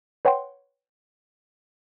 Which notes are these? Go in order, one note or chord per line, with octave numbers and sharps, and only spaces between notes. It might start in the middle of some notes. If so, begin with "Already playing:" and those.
B4 C#5 F#5 G5 C6